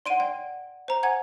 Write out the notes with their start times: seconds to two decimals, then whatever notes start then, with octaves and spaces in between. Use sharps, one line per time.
0.06 D5 F#5 C6 D7 D#7
0.20 D5 G5
0.88 C5 A#5
1.03 F#5 G#5 G#6